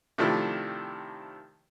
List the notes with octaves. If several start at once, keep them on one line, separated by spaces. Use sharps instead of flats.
C3 D#3 F3 A3 D4 E4